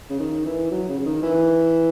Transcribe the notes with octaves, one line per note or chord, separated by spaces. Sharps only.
C#3
D#3
E3
F#3
C#3
C#3
D#3
E3